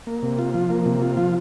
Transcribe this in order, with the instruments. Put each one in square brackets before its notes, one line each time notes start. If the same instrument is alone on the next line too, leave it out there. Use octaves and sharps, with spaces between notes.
[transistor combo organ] A#3
C3
F4
F3
A#3
C3
F4
F3